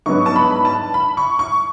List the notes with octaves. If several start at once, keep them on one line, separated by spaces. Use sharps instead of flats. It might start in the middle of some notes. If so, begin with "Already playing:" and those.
G#2 F#3 B3 D4 C#6
A5
B5
A5
B5
C#6
C#6